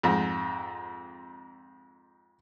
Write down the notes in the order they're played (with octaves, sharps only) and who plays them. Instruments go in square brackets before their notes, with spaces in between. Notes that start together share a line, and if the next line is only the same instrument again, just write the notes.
[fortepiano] F2 G#2